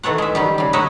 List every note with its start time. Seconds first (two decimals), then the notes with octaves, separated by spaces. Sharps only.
0.03 D#3 E3 A4 C#5 F#5
0.18 G#3 E5
0.35 D#3 G3 G4
0.58 C#3 G3
0.73 D#4 C#5 D#5 E5 F#5